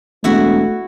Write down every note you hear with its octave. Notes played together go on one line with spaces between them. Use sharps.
E1 A3 E4 F#4 E5